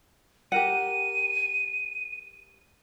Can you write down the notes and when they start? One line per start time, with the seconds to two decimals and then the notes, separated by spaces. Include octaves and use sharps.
0.52 G4 A#4 F#5 D#7